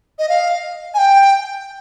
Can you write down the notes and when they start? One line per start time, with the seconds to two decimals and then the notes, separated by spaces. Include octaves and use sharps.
0.19 D#5
0.29 F5
0.94 G#5
0.98 G5